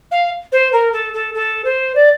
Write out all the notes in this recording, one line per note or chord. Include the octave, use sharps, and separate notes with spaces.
F5
C5
A#4
A4
A4
A4
C5
D5